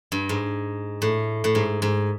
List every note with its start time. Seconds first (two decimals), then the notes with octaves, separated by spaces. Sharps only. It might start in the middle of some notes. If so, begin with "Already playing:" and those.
0.12 G2
0.29 G#2
1.02 A2
1.44 A2
1.55 G#2
1.82 G#2